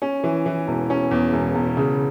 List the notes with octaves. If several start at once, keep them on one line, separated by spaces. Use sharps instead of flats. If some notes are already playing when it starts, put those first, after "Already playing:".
C#4
E3
E3
E1
C#4
E2
E1
E1
C#3